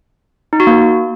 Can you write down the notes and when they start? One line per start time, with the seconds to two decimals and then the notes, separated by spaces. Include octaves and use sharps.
0.53 D#4
0.60 F#4
0.67 A#3